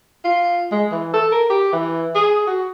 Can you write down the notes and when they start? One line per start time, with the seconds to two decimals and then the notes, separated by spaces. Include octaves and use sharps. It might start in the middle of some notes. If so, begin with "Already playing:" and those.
0.24 F4
0.71 G#3
0.92 E3
1.13 A4
1.32 A#4
1.49 G4
1.72 E3
2.15 G#4
2.47 F#4